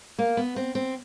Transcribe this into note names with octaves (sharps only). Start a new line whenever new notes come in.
A#3
B3
C4
C4